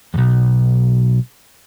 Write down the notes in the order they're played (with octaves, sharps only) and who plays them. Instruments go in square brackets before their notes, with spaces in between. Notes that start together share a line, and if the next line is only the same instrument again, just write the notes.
[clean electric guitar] B1 E2